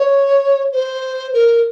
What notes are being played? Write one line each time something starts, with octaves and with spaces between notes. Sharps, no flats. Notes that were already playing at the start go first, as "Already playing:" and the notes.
Already playing: C#5
C5
A#4